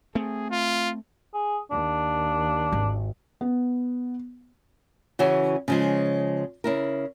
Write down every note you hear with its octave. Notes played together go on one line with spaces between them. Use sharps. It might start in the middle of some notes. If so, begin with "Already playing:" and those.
A3 C4 G#4
F4
G#4
D#2 D4
G#1
B3
C#3 E3 C#4 F#4 G#4
C#3 F3 G#3
C#3 E4 A#4